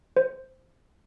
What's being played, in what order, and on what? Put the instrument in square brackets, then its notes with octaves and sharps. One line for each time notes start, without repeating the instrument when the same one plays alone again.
[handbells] C5